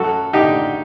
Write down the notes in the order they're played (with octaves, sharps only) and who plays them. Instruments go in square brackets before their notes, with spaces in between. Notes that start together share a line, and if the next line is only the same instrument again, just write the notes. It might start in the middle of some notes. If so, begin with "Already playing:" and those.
Already playing: [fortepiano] F#2 F#4 A4
D3 D#4 G4